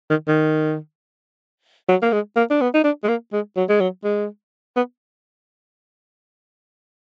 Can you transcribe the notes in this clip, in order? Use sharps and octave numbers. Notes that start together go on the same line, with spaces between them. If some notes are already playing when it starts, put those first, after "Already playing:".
D#3
D#3
F#3
A#3
G#3
A#3
D4
B3
D#4
D4
G#3
A#3
G#3
F#3
G#3
F#3
G#3
B3